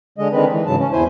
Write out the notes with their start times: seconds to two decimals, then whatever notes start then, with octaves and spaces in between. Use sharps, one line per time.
0.18 D3 G#3 D#5
0.33 D3 D#3 G#3 C4 B4
0.50 E3
0.66 G#2 C#3 F#3 A5
0.79 C#4
0.93 E2 E4 C5 G#5